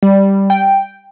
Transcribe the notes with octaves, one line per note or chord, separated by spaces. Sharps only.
G3
G5